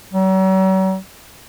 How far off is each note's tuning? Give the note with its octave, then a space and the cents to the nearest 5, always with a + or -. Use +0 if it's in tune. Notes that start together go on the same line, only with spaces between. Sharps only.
F#3 +45